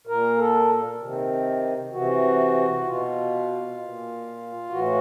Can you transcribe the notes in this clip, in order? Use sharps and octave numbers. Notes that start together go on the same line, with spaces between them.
A#2 A#4
A4
C3 D#3
C3 E3 F#4
B2 F4
A#2
A2 E3 F#4